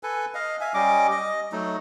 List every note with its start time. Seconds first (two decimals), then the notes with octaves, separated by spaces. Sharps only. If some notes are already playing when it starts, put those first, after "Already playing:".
0.03 A4 B4 G#5
0.34 D#5 F5
0.61 E5 F5 G#5
0.74 G3 C#4 D#5 D6
1.11 D#5
1.52 F#3 A3 D#4